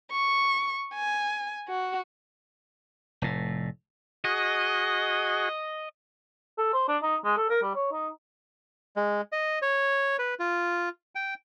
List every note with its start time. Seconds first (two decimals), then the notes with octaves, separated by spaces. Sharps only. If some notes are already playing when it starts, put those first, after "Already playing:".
0.12 C#6
0.94 G#5
1.69 F#4
3.22 F1 A2
4.25 F#4 G#4 D#5
6.58 A4
6.74 C5
6.88 D4
7.02 D#4
7.24 G#3
7.37 A4
7.50 A#4
7.63 G3
7.75 C#5
7.92 D#4
8.96 G#3
9.32 D#5
9.62 C#5
10.19 B4
10.40 F4
11.15 G5